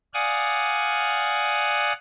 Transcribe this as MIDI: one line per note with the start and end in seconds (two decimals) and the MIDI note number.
0.14 1.93 74
0.14 1.93 77
0.14 1.93 78
0.14 1.93 80
0.14 1.93 87